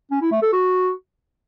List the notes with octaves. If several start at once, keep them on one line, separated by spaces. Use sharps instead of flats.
C#4
E4
A3
A4
F#4